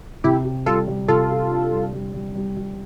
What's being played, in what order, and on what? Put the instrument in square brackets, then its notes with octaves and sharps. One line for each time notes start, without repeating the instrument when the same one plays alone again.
[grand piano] C3 [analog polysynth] E4 G4
[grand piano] G4
[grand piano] G3 [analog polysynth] F4 A4
[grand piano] G3
[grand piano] C3 [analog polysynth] F4 A4
[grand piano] G4
D4
G3
G3
G3
G3
G3